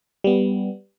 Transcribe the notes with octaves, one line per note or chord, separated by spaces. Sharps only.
G3 B3